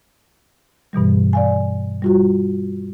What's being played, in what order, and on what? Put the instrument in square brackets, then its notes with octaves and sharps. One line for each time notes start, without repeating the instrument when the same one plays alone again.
[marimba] G2 B2 E3 G3
D5 F5 G#5
G3 F4 F#4